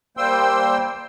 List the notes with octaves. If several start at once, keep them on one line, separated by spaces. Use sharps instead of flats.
G3 A#3 C5 G5 C6 E6